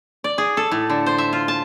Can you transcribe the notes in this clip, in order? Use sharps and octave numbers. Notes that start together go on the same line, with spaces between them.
D5
G#4
A4
A2
D3
C5
E5
F4
A5